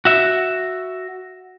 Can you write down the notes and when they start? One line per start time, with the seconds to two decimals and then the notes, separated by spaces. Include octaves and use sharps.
0.05 F#4 E5